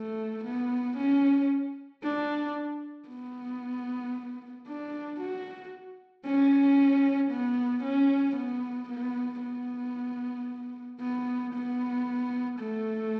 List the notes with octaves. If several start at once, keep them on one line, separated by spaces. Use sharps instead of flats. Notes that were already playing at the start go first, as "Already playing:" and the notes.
Already playing: A3
B3
C#4
D4
B3
D4
F#4
C#4
B3
C#4
B3
B3
B3
B3
B3
A3